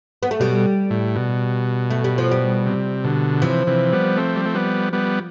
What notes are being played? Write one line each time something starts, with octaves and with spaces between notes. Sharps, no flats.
B3
A3
B2 G3
A2
B2
A3
G3
F3
G3
C3
B2 D3
C3 E3 F3
C3 E3
G3 B3
A3 C4
G3
A3
G3 B3
G3 B3